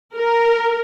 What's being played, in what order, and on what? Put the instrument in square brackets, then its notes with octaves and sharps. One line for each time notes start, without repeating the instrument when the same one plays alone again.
[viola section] A#4